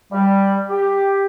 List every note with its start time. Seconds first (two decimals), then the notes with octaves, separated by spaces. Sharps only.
0.12 G3
0.69 G4